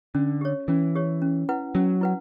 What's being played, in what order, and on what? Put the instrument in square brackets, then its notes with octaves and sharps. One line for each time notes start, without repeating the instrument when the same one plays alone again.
[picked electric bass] D3 [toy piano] C#4
[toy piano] G4 C#5
[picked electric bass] E3 [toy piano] C#4
[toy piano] G4 C#5
C#4
E4 B4 F#5
[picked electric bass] F#3 [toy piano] C#4
[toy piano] E4 B4 F#5